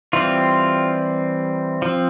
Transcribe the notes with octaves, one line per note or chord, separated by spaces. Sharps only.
E3 G3 C4 F4
F3 C4